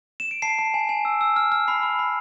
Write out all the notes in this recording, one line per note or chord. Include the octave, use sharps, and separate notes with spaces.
E7
D7
A5 C7
A5
G#5
G#5
E6
E6
F6
F6
B5 C7
B5
B5